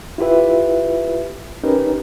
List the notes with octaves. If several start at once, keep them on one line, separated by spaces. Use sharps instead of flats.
E4 F4 G4 B4 E5
C#4 D#4 G4 A#4 B4